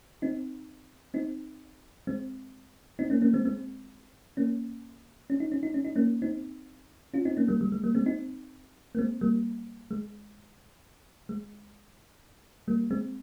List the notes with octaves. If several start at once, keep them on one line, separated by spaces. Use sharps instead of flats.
C4 D#4
C4 D#4
G#3 C4
C4 D#4
A#3 C#4
A#3 C#4
G#3 C4
G#3 C4
A#3 C#4
C#4
D#4
C#4
D#4
C#4
D#4
A#3 C#4
C4 D#4
C#4 F4
C4 D#4
A#3 C#4
G3 A#3
G3
G#3
G3 A#3
G#3 C4
C4 D#4
A#3
G#3 C4
G3 A#3
G#3
G#3
G3 A#3
G#3 C4